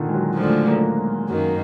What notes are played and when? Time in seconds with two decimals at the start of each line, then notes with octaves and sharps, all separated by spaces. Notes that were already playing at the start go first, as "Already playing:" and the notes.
Already playing: A#2 D3 D#3
0.09 G#3
0.14 F#3
0.37 D2 D3 F3 G#3
0.68 A#3
0.98 G#3
1.29 F#2 D#3 F#3 A#3